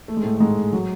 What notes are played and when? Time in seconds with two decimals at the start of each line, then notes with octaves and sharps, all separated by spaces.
0.08 A3
0.17 G#3
0.23 A2 A3
0.35 A3
0.40 G#2 G#3
0.72 F#3